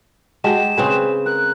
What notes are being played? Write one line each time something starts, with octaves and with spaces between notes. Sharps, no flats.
G#3 F#4 G4 A5 E7
C#3 C4 G#4 B4 C5
A#4 F#6